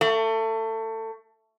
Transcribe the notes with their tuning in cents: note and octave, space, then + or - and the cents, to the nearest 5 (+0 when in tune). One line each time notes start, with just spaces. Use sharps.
A3 +25